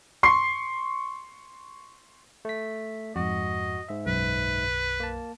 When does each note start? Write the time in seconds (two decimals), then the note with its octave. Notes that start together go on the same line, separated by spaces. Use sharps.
0.23 C6 C#6 C7
2.45 A3 B6
3.16 F2 G#2 F#4 D#5
3.89 G#2 E5
4.07 B1 F#2 B4
5.00 A#3 A5